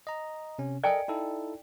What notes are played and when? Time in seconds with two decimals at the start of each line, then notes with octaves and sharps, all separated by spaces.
0.07 D#5 A#5
0.59 C3 C#4
0.83 A4 A#4 D5 D#5 G5 G#5
1.08 D#4 E4 A4